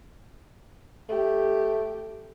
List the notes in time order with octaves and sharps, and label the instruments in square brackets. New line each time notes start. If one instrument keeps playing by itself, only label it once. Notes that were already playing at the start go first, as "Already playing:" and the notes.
[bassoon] A3 [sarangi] G4